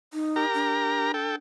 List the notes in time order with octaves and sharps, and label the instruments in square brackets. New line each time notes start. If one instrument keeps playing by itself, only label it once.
[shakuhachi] D#4
[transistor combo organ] G4 A#4 A#5
[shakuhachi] D4
[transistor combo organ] A4 G5